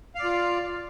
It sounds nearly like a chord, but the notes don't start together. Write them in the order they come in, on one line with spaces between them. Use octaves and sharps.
F5 D5 F4